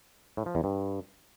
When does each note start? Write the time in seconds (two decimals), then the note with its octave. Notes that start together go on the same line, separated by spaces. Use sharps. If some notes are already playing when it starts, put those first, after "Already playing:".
0.37 A2
0.46 F3
0.55 E2
0.64 G2